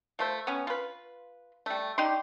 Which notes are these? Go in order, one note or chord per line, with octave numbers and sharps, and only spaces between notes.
F3 A3 C5
B3 C#4
F4 B4
G3 A3
D#4 G4 D5 C6